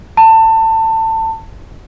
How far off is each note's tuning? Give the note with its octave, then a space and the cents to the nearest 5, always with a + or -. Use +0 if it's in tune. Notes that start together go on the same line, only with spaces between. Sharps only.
A5 +25